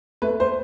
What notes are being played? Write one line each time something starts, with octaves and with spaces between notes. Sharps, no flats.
A3 B4
C5